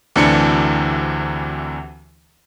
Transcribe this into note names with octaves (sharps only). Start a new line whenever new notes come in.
D2 C3 E3 D4 A5 C#7